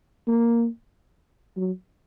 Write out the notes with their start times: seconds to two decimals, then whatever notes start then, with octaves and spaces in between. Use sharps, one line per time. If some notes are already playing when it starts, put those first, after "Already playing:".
0.28 A#3
1.57 F#3